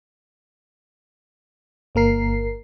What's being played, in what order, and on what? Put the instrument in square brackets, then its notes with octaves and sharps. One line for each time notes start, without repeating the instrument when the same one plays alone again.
[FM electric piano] G1 A#3 A#4 C7